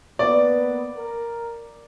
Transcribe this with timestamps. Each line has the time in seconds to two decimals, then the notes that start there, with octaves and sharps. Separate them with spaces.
0.19 A#3 B3 B4 D5
0.96 A#4